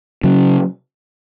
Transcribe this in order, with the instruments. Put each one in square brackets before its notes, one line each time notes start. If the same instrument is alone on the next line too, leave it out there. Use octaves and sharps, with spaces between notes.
[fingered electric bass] C#3 F#3